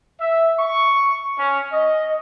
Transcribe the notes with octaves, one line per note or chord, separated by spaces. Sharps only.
E5
C#6
C#4
D#5